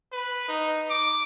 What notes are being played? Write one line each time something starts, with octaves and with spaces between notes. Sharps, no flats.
B4
D#4
D6